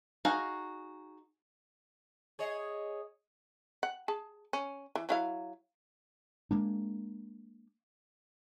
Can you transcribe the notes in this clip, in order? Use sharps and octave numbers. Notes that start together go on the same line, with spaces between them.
D#4 F#4 G#4 F5 A#5
G#4 C#5 D#5
F#5
G#4 A5
C#4
E3
F#3 E4 F5
G#3 A#3 D4